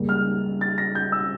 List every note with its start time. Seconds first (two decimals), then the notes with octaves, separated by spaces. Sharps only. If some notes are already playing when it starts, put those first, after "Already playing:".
Already playing: C#2 C#3 G3 A#3
0.09 F6
0.61 A6
0.78 A#6
0.95 G6
1.12 E6